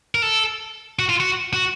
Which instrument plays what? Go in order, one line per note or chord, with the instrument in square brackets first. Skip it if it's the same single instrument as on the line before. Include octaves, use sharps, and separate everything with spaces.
[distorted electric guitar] A#4
A4
F#4
F4
F#4
F#4